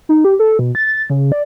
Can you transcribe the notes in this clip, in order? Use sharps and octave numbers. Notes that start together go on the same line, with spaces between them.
D#4
G4
A4
B2
A6
C#3
D5